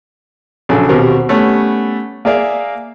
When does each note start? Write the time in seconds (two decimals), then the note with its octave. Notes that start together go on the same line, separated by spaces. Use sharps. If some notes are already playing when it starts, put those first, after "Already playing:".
0.69 A#1 C#3 F#3 A4 G#5
0.89 D#2 B2 C4 F#4 G4 A#4
1.29 G3 A3 B3 C#4
2.25 A#3 G#4 A#4 D5 E5 F5